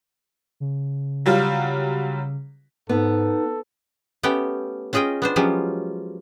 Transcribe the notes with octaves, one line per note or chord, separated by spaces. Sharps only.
C#3
F#3 G3 F4
G#2 B3 D#4 A4
A3 B3 C#4 G4 G5
C#4 F4 G#4 D#5 G5
B3 D4 C5
F3 F#3 G#3 C#4 F4 G4